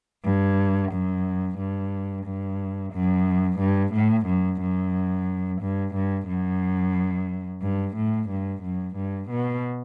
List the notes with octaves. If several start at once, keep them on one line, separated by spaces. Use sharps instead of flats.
G2
F#2
G2
G2
F#2
G2
A2
F#2
F#2
G2
G2
F#2
G2
A2
G2
F#2
G2
B2